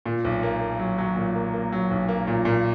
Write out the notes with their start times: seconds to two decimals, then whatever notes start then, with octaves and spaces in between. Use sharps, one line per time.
0.06 A#2
0.24 B1
0.43 A#3
0.61 A#3
0.79 F#3
0.98 F#3
1.16 A#2
1.35 A#3
1.54 A#3
1.72 F#3
1.91 B1
2.08 A#3
2.27 A#2
2.45 A#2